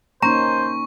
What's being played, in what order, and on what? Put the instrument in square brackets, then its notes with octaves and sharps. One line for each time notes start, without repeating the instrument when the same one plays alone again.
[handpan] A#3 C#4 D#4 [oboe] C5 [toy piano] A#5 [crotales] C#6